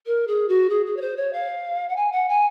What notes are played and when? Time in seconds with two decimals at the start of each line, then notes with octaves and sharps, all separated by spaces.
0.06 A#4
0.27 G#4
0.48 F#4
0.69 G#4
0.86 G#4
0.96 C#5
1.01 C5
1.16 C#5
1.33 F5
1.89 F#5
1.96 G#5
2.12 F#5
2.28 G#5